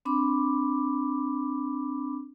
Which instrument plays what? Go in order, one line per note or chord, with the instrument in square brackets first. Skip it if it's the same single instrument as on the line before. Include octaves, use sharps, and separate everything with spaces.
[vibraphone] C4 D4 B5 D6